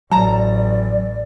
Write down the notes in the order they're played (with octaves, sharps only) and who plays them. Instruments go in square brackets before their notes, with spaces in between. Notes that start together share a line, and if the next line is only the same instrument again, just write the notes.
[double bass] A1 [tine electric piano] F#3 [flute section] D5 [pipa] A5 A#5